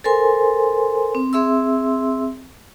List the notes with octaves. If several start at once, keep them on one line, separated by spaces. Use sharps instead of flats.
A4 A#4 C5 G#5 C6
C4
C4 G#4 E5 C6 E6